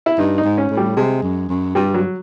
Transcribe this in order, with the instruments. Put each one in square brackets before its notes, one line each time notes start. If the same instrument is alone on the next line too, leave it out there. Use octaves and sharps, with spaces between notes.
[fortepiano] E4
[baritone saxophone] G2 [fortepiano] D#4
[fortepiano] D#4
[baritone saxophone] G#2
[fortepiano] C#4
[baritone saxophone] A2
[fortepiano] G3
[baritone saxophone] C3 [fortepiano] G#3
[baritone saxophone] F#2
F#2
[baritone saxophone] G2 [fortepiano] G3
[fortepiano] F#3